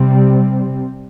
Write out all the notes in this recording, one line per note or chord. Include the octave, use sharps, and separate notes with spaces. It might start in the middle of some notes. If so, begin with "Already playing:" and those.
Already playing: C3 G3 C4